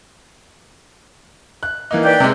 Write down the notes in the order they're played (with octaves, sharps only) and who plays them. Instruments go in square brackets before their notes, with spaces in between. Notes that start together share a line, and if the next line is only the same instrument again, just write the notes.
[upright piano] F#6
E3 A#3 D#4
[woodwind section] B4 D5 G5
[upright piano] C3 G#3